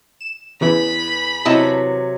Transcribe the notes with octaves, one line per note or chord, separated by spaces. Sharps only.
E7
E2 C#3 E3 B3 E4 B5
C3 F#3 E4 D#5 A5